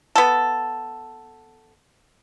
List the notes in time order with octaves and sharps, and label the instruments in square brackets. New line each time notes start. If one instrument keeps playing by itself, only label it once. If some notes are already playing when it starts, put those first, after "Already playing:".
[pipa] B3 A4